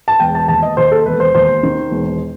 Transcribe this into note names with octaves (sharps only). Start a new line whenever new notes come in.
A5
E1 G5
A5
D#2 A5
D#5
D#2 C5
A4
E1 B4
C5
D#2 C5
D#3
E1